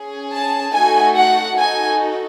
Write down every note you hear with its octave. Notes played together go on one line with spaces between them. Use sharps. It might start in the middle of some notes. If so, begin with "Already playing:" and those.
Already playing: C#4 G#4
A5
A3 D#4 F#4 A4 G#5
F#5
D#4 F#4 A4 G#5